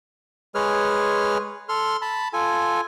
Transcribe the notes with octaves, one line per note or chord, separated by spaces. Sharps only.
G#3 G#4 B4 C#5 F6
A4 C6 F6
A5 B5
F4 A4 G#5